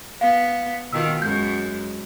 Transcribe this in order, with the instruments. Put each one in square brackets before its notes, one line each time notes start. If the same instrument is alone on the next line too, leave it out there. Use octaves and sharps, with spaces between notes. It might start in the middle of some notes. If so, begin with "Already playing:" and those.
[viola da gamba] B3 [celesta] F5
[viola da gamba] B2 D#3 F4 [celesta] E6
[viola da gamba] F#2 G#3 [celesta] G6